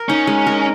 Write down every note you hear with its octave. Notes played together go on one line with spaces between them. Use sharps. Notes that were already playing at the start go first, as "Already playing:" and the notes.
Already playing: A#4
C#4 D#4
G#3
A#4